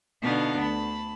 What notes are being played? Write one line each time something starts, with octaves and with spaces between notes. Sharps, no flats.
B2 D3 B3 D4 D#4 F5
D2 A5 B5